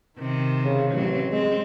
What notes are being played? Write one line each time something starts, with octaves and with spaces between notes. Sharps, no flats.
C3 D#3
C#3
A1 F#3 C4
G#3 C4